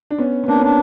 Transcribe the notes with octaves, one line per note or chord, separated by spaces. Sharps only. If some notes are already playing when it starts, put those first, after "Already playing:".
D4
B3 C#4
B3
A#3 C4 D4
B3 C#4
D4